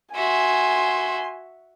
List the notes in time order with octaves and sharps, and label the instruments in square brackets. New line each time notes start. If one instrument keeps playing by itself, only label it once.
[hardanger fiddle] F#4 E5 [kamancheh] G#5 C6